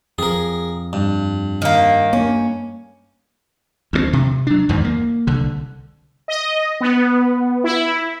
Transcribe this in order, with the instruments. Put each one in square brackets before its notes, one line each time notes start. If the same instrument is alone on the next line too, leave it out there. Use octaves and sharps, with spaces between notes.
[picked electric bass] F2 [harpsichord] G#4 A#4
[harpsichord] G2
[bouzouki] D#3 A#3
[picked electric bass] G2 A#3 [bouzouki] C#4
[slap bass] D2 G3 C4
C3
F#3 D4
E2 G#2 D#3 E3
A#3
C2 D3
[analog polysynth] D#5
B3
E4